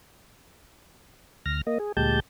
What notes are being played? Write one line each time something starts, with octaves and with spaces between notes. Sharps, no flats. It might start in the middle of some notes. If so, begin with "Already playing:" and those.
D2 F6 A#6
A#3 D#5
G#4
D2 A#2 G#3 G4 A5 G6